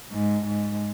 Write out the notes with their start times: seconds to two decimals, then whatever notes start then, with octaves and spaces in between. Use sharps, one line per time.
0.12 G#2
0.46 G#2